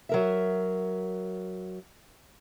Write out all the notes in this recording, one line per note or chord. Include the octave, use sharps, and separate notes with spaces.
F#3 A#4 E5